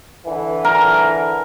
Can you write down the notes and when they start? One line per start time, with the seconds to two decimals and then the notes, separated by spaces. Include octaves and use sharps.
0.24 D3 E3
0.65 A#4